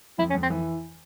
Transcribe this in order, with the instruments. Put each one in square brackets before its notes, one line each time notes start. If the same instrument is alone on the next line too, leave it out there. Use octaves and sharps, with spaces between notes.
[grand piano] F2 [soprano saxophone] E4
[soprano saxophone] C#4
[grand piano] F2
[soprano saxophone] C4
[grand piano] E3